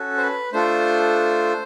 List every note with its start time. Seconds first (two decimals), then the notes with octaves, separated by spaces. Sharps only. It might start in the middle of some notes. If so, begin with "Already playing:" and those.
Already playing: C#4 F#4 A4
0.17 C5
0.22 B4
0.52 A3 D4 F4 A4 C5